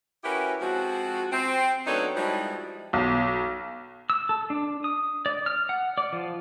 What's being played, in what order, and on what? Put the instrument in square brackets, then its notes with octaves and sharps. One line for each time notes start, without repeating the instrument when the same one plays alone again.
[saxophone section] C#4 E4 F#4 G4 A#4 B4
F3 G#3 C4 F#4
C4
F#3 B3 D4 D#4 A4 C#5
F3 G3 G#3 D#4 E4 F#4
[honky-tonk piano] B1
[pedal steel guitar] E6
A4
D4
D#6
D5
F6
F#5
D5
F3